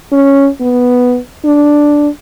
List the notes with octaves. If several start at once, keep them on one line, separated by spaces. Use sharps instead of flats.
C#4
B3
D4